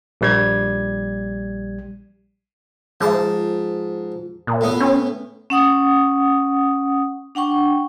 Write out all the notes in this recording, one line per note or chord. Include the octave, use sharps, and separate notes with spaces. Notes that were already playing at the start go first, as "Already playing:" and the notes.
A#1 G3 G#6
G#2 F3 A5
A#2
A2 B3
C#4
C#4 F#5 D#6
D4 F#5 G5 C#6